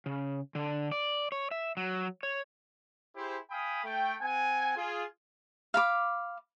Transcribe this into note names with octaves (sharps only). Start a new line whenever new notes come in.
C#3
D3
D5
C#5
E5
F#3
C#5
E4 G4 G#4 C5
F5 G5 G#5 B5 D#6
A3 G5
C4 F#5 G#5
F4 G#4
F5 B5 D6